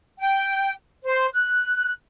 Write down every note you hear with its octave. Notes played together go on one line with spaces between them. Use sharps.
G5
C5
F#6